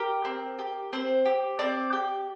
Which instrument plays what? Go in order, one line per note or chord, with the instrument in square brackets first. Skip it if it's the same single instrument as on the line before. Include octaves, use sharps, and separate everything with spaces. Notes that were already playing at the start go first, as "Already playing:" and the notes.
Already playing: [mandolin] G4 A#4
C4
G4
C4 C5
G4
C4 D5
G4